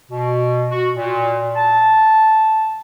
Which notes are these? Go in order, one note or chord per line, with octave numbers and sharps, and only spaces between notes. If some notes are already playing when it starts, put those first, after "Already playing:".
B2
F#4
A#2
A5